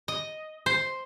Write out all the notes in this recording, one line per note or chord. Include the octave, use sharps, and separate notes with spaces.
D#5
C5